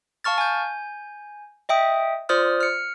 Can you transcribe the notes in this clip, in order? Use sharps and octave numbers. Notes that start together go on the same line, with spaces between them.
F5 A5 C#6 F6 A6
G#5 G6
D#5 E5 G5 D#6
F4 C5 D5 D#6 F6
F6 C#7